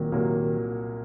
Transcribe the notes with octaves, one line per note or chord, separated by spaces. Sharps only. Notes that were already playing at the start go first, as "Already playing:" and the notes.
Already playing: C2 A#2 D#3 F#3 A#3
C2 A#2 F#3 A#3